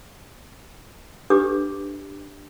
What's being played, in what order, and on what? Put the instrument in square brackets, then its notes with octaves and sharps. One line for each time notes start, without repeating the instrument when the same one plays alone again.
[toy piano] D4 G4 A4 B4 D6